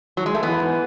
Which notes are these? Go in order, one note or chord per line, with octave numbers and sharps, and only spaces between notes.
F#3
G#3
A3
E3 B3
G#2